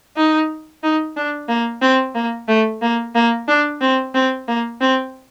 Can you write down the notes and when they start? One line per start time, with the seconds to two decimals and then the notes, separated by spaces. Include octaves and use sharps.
0.16 D#4
0.83 D#4
1.16 D4
1.49 A#3
1.82 C4
2.15 A#3
2.48 A3
2.82 A#3
3.15 A#3
3.48 D4
3.81 C4
4.14 C4
4.48 A#3
4.81 C4